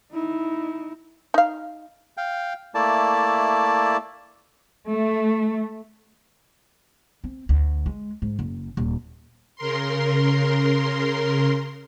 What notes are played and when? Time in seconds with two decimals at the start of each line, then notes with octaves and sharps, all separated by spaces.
0.12 D#4 E4
1.34 D#4 F5
2.17 F5 G5
2.75 A3 A#3 E4 D5 A5
4.89 A3
7.24 C4
7.49 D2
7.86 G#3
8.22 G#2
8.39 F#1
8.77 D#1
9.56 C#3 A#4 C6